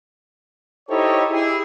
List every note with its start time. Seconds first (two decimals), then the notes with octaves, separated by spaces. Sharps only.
0.89 D#4 E4 G4 A4 C5 C#5
1.31 E4 G4 G#4